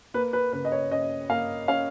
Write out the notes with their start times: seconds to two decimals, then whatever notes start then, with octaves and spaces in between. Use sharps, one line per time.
0.14 A#3 B4
0.33 B4
0.53 C#3 B4
0.65 D#5
0.72 C#5
0.91 C#4 D#5
1.29 A#3 F5
1.68 C#4 F5